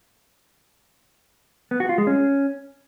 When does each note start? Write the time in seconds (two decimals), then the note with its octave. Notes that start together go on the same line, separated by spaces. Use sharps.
1.71 B3
1.80 F#4
1.89 F4
1.98 G#3
2.07 C#4